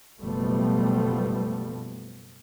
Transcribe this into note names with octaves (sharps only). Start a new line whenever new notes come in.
F#1 B2 F3 G3 A3 B3